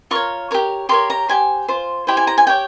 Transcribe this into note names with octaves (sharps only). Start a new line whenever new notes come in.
F4 A#4 C#5 C#6
G4 A#4 C#5
G4 A#4 C#5 C6
A#5
G4 C5 G#5
F4 C5
E4 G4 C5 G5
G#5
A#5
G#5
G4 C#5 G5